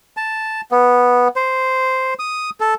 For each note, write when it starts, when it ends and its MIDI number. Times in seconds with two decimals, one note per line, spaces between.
0.17 0.61 81
0.71 1.28 59
1.36 2.14 72
2.19 2.50 87
2.60 2.74 69